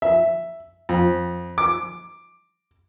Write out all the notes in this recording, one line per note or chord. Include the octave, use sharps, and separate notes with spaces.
E5
F2
D6